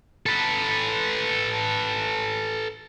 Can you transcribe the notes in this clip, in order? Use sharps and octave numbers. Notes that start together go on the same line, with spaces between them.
A4 B4